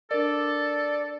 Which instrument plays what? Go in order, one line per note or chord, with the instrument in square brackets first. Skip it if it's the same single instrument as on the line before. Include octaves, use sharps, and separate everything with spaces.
[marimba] D4 A#4 [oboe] A4 [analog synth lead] D5